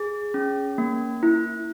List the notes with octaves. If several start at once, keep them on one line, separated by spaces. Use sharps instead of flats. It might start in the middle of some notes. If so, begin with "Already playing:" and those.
Already playing: G#4
C#4
A#3
E4